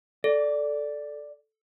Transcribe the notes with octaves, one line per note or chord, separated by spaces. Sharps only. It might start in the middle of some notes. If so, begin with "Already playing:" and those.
A4 D5